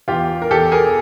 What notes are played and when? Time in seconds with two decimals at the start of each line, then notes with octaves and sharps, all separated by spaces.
0.08 E2 F4 G4
0.42 A#4
0.50 E2 G4 A4
0.72 G#4 A#4